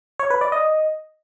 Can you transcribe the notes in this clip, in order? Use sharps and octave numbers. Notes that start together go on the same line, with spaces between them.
C#5
B4
D5
D#5